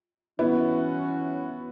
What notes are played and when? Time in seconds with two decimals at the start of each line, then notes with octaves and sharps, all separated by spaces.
0.39 E3 B3 C#4 E4 F#4